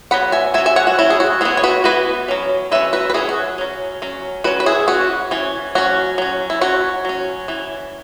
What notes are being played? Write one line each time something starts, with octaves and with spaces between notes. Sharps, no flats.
F#3 B3 F#5 B5
E5 G#5
F#3 C#4 E5 G#5
E5 G#5
C#5 F#5
F#4
F#3 C#4 E4
G#4
F#4
E3 B3 E4 G#4
C#5
F#4 B4
E3 B3 F#4 B4
F#3 C#4
F#3 C#4 B4 E5
F#4 B4
B4
F#3 C#4 E4 G#4
F#4
F#3 C#4
F#3 C#4
F#3 C#4 F#4 B4
B4
E4 G#4
E3 C#4 F#4
E3 C#4
F#3 C#4 F#4
F#3 C#4
E4
F#3 C#4 F#4
F#3 C#4
E3 C#4